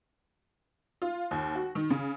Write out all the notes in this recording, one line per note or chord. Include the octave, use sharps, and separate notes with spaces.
F4
D#2
F#4
D#3
C#3